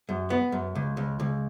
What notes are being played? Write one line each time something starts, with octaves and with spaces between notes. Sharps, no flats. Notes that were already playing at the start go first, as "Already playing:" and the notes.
F#2
B3
F#2
C#2
C#2
C#2